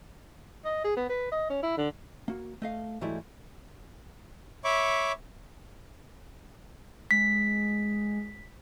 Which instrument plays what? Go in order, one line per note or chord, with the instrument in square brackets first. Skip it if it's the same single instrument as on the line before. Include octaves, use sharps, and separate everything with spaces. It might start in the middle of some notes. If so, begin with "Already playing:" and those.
[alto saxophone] D#5
G#4
B3
B4
D#5
C#4
E4
D3
[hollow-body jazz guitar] A#3 F#4
A3 D#5 F5
G#2 E3 F#3 G3 A3 E4
[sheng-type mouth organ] C#5 E5 B5 C#6 D6
[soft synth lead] G#3 [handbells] B6